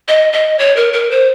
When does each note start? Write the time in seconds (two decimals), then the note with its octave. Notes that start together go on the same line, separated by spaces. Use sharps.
0.08 D#5
0.33 D#5
0.59 C#5
0.76 A#4
0.93 A#4
1.11 C5